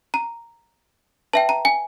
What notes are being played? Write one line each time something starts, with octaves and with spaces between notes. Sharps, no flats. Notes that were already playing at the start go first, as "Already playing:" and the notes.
A#5
B4 E5 G5 A5
A#5
G#5